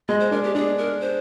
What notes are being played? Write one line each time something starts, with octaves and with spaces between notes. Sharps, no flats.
G#3 D#5
C5
D4 A#4
G4
D4 G#4
A#4
C5